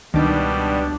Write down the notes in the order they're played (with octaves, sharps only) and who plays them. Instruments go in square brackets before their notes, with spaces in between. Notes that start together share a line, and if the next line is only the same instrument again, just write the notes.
[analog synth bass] C#2 [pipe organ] B2 G3 [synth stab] D#3 D6 [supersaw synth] D4